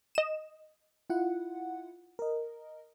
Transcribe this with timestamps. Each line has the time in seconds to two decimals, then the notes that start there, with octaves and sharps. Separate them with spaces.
0.15 D#5 E7
1.10 E4 F4 F#5
2.19 A#4 D#5